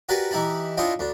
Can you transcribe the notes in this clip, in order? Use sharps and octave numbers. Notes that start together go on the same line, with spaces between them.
F#4 G4 A#4 B4 D5 G#5
E3 D#4 E4 G4 A5 B5
D4 E4 F4 C#5 D#5 G5
D2 D4